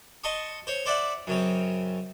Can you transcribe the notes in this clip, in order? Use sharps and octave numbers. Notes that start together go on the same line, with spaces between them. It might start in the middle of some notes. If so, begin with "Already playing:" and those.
D#5 A5 C6 C#6 D#6
C5 C#5
C5 D5 E5 F#5
F#2 C#3 C4